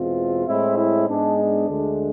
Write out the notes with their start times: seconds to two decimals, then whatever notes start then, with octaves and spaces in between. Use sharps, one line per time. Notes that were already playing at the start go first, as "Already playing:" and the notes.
Already playing: E2 B2 G#3 C4 F4
0.46 A2 G#3 C4 E4
0.78 E4
1.07 G#2 G#3 B3 D4
1.38 D4
1.68 D2 D3 G#3